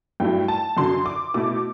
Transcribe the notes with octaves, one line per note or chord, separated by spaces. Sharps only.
G2 F#3 A3 E4 G5
A5
F#2 D3 F#3 C6
D6
B2 A3 E4 D6